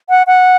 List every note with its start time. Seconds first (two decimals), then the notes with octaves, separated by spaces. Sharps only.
0.09 F#5
0.27 F#5